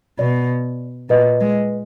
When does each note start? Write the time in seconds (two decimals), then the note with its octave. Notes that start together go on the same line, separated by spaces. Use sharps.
0.19 B2 D5
1.09 A#2 B4 D#5
1.41 G#3